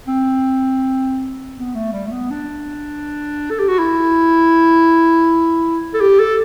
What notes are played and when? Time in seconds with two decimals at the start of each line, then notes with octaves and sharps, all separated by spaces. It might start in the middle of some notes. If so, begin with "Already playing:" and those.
0.08 C4
1.57 B3
1.75 A3
1.93 G3
2.07 A3
2.11 B3
2.31 D4
3.50 A4
3.59 G4
3.69 F#4
3.79 E4
5.94 A4
6.01 G4
6.19 A4